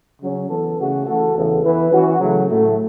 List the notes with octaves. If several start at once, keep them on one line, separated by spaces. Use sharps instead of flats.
C#3 F#3 C#4
E3 B3 A4
C#3 A3 C#4 F#4
E3 A3 F#4 A4
E2 C#3 E3 B3 A4
E3 B3 E4 B4
E3 C#4 F#4
C#3 F#3 A3
A2 F#3 A3